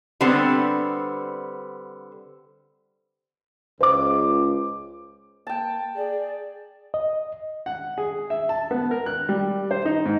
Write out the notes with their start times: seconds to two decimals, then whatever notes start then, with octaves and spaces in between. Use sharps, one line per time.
0.21 D3 G3 B3 C4
3.81 C#2 C5 D6
5.47 A#3 G5 A5
5.96 G#4 D5
6.94 D#5
7.66 F#5
7.98 G#4
8.30 E5
8.49 A5
8.71 B3
8.91 A#4
9.06 F#6
9.29 G3
9.71 C5
9.86 D#4
10.06 G#2